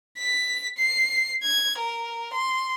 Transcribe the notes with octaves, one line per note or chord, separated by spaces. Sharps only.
B6
C7
G#6
A#4
C6